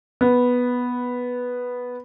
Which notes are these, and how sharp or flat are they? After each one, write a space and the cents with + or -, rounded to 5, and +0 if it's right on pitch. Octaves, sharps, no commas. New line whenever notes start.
B3 -5